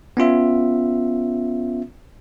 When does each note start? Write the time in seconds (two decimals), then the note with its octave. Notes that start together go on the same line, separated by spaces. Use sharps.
0.17 B3 C#4 F4 E5